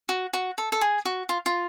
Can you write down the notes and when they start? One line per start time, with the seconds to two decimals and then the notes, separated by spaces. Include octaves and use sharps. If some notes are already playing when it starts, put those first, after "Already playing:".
0.09 F#4
0.33 F#4
0.58 A4
0.72 A4
0.81 G#4
1.05 F#4
1.29 F4
1.46 F4